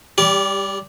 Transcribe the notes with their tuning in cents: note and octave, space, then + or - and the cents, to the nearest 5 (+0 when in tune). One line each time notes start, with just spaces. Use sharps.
G3 +20 G4 +0 D5 -30